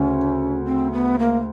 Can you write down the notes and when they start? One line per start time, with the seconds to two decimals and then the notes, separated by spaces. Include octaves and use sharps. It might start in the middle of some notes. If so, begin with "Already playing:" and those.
Already playing: D2 C#3 C#4
0.65 C4
0.92 B3
1.19 A#3